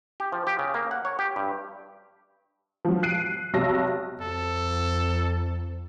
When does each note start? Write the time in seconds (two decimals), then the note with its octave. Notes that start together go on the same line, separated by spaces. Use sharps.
0.20 G4
0.32 F3
0.47 G4
0.59 C#3
0.74 A#3
0.91 F#5
1.05 C#5
1.19 G4
1.36 G2
2.85 F3 F#3
3.03 F#6 C7 D7 D#7
3.54 B1 C3 A5 A#6
4.21 F2 A4